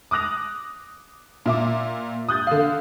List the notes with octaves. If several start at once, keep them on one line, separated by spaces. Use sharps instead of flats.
D6 D#6 F#6 A#6 F7
A#2 E5 D6
D#6 F#6 G6 A6
D3 F5